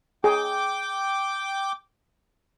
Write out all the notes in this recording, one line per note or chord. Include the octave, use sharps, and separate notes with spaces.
G#4 G5 D6